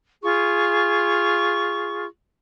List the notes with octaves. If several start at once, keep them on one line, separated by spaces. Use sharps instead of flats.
F4 G#4 C#6